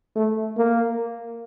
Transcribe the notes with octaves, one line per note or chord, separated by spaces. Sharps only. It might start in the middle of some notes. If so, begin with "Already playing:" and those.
A3
A#3